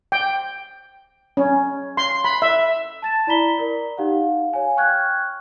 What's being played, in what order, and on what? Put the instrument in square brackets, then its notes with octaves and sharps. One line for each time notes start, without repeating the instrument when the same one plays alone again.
[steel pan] G5
C#4
C6
B5
E5
[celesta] A5 A6 E7
E4 D5 A#5 B5 B6 G7
A#4 D5
D#4 G4 F5 F#5
C#5 F5 G#5
G5 C#6 F6 F#6 G#6